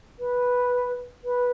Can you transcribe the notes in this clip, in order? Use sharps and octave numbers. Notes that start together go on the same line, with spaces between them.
B4
B4